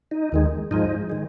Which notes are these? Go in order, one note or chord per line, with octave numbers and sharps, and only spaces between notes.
D#4
D#2 D#3 G#3
G#2 F3 G#3 D#4
D#3 G#3